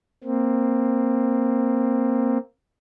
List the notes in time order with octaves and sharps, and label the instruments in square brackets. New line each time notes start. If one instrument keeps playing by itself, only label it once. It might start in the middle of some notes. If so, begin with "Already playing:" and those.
[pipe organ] A#3 C4